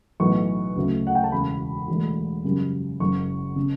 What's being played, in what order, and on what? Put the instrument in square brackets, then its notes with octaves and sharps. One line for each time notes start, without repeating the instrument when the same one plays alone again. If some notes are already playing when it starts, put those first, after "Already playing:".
[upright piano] B1 A2 E3 B3 C#6
D2 C#3 F#3 A3
F#5
G5
A5
E1 E2 C#3 B5
E1 E2 D3 A3
F#2 C#3 G3
F#1 F#2 C#3 C#6
C#3